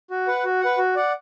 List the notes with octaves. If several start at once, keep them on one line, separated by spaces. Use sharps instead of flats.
F#4
B4 F#5
F#4
B4 F#5
F#4
D5 F#5